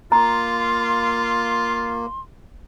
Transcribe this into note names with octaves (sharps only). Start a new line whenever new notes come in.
A#3 F4 A#5 C6